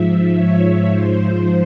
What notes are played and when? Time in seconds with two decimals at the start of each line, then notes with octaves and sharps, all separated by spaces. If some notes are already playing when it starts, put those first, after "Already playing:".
Already playing: G#2 F3 E5
0.35 C#5
0.89 G#2 F3 C5